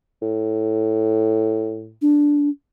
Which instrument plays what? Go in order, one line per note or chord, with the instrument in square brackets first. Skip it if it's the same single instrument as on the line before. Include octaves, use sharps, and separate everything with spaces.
[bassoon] A2
[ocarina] D4